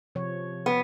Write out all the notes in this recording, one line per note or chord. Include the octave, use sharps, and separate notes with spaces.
C3 F3 C#5
B3